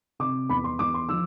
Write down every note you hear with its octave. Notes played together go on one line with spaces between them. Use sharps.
C3 D6
E2 B5
C6
E2 D6
C6
F3 E6